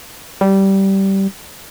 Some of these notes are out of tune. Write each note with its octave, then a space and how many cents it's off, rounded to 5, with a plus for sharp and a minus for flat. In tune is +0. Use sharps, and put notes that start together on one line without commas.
G3 -15